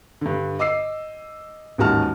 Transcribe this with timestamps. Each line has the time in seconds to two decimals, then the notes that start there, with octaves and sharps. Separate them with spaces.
0.21 G2 D3
0.59 D#5 D6 E6 C7
1.78 A1 D#2 G#2 F#4 A5 F6